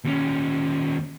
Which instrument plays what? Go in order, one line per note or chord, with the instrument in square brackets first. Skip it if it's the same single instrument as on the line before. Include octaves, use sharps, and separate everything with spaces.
[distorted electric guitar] D#2 C#4